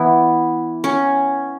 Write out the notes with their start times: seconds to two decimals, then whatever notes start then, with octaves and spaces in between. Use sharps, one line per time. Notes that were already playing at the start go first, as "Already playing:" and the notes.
Already playing: E3 B3 E4
0.84 C#4